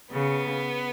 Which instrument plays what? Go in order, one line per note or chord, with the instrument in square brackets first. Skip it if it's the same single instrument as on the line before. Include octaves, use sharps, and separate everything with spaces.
[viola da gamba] C#3 [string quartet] B3